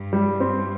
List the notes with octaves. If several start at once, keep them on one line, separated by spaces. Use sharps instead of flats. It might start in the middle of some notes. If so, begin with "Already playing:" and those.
Already playing: G2
G3
C4